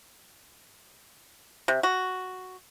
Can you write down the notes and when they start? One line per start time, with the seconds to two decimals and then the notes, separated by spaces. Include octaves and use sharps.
1.68 C3
1.83 F#4